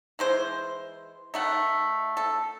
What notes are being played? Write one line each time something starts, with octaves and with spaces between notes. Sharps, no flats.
E3 G#3 C5
D#3 A3 F#5
A4